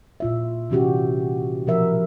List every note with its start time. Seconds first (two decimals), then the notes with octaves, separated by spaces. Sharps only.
0.20 A#2 F4 E5
0.70 C3 E3 C#4 F#4 G4
1.67 B2 F3 A#4 E5